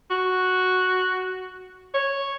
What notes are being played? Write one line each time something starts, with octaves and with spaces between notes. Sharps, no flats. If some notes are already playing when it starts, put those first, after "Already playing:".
F#4
C#5